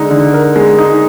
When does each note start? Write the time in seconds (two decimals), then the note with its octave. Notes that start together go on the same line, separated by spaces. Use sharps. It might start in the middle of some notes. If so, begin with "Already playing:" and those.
Already playing: D3 G#3 D#4
0.11 D3
0.34 A#4
0.56 G#3
0.79 D#4